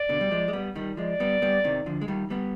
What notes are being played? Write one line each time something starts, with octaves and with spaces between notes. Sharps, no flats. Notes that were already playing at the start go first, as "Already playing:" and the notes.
Already playing: D5
B2 D3
G3
F3 G#3
G#3
G3 B3
D#3 G3
F3 G#3 D5
G3 B3
G3 B3
C3 D#3
D3 F3
G#3
D#3 G3
G3 B3